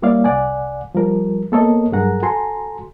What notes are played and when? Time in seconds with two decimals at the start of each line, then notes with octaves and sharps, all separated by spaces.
0.02 G3 A#3 E4 C#5 D5 F5
0.24 C2 D5 F#5 G#5
0.95 F3 G3 A#4
1.52 A#3 B3 A4 A#4 C#5 D#5
1.92 G2 F#3 G#4 A#4 F#5 A#5
2.23 F#4 A4 G#5 A#5 C6